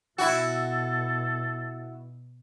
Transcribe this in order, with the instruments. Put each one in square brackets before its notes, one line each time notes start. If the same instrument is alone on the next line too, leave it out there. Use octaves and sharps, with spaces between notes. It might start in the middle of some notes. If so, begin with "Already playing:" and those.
[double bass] B2 [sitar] E4 F#4 [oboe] A4